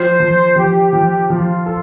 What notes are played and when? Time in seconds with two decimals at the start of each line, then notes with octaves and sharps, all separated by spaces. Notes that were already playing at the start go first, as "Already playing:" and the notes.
Already playing: F3 C5
0.20 F3
0.56 F3 G4
0.93 F3
1.30 F3 F4
1.66 A4